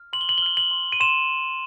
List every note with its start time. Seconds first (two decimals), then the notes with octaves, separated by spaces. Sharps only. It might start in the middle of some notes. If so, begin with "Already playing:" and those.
Already playing: F6
0.13 C6 F#7
0.21 G7
0.29 F#7
0.38 G7
0.42 F6 F#7
0.57 F#7
0.71 C6
0.92 D#7
1.00 C6 E7